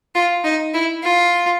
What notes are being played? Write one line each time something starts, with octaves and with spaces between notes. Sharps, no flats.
F4
D#4
E4
F4